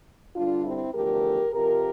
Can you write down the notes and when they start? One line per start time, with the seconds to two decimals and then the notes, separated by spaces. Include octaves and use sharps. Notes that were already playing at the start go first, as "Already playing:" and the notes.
0.36 G2 D3 G3 D4 F4
0.65 C4 E4
0.94 E2 D3 F3 A3 G4 A#4
1.52 F2 C3 F3 G4 A#4